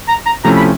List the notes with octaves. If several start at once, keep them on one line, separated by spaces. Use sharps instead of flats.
A#5
A#5
C3 F3 A3 C#4 E4 A#5
B5